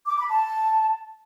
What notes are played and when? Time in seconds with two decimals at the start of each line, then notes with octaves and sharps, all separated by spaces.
0.06 D6
0.18 B5
0.30 A5